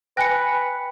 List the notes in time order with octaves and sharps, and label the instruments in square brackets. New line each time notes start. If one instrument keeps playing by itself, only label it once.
[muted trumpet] B4 [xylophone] G5 C#7 [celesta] G#5 F#6 A#6